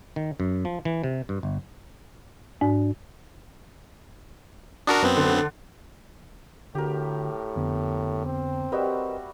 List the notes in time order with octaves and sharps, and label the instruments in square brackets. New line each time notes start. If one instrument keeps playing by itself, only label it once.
[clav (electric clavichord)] D#3
F#2
F3
E3
C3
G2
G1
[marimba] G#2 [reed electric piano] D4
[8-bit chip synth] D4 F#4 A#4 [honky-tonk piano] A5 D#6
[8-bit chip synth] F#2 B3 C4 [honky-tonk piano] B4
[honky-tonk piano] D3
[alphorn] A2 [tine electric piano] D3 F#4 [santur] G4 A#4
[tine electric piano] F2 D3 B3
[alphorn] C4
[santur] G3 F#4 E5 [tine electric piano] A#4 B4 D#5